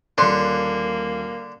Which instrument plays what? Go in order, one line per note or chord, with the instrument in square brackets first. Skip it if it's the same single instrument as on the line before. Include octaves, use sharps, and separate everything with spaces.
[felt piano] D#1 F#6 [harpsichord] D3 [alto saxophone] A#3 [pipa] C6